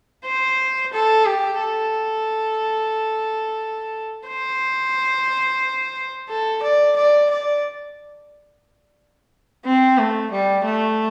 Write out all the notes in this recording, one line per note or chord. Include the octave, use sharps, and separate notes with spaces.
C5
A4
G4
A4
C5
A4
D5
D5
D5
C4
A3
G3
A3